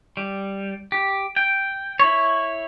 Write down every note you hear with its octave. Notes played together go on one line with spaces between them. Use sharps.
G3
G4
G5
E4 C#5